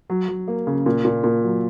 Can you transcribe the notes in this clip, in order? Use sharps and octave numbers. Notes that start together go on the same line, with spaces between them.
F#3
F#3
A#3
C#3
A#2
A#2
A#2
F#3